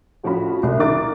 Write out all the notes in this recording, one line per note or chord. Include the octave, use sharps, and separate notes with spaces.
A2 F3 C#4 F4 F#4 B5
C2
D#3 A#4 D6 A6